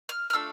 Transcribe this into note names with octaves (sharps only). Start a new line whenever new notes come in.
F6
F6
A3 D4 F4 A4 E6